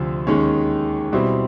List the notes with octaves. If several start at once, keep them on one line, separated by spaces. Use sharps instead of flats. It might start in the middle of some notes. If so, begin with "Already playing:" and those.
Already playing: D2 C3 F3
D#2 D#3 G#3 C#4
B2 G3 C4 E4